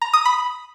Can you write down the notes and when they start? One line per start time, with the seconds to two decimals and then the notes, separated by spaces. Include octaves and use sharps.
0.02 A#5
0.13 D#6
0.25 B5